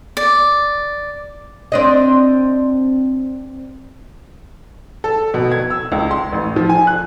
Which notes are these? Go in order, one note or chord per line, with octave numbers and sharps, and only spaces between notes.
D5
C4 D4 D#5
A4
B2
G#6
E6
C#2
C6
A1
F3
G#5
F#6